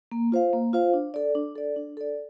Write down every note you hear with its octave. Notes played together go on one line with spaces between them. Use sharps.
A#3
F4 C5 F5
A#3
F4 C5 F5
D4
A4 D5
D4
A4 D5
D4
A4 D5